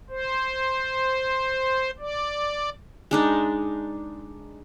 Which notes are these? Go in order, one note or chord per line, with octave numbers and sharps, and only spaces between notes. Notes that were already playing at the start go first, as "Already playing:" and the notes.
C5
D5
G#3 D4 D#4